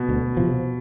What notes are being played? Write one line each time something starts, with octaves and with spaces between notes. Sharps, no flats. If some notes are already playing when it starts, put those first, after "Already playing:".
Already playing: B2
D2
C3 F3